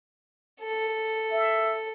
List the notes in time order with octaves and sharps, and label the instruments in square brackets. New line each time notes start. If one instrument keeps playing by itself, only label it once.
[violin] A4
[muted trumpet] E5